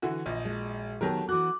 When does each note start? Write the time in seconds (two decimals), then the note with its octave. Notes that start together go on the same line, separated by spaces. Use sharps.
0.02 D3 E3 F#4
0.26 A#1 D#5
0.45 G#3 F#4
1.01 D#3 F#3 A3 B3 G4 A#4 A5
1.29 E3 F#4 D6 F#6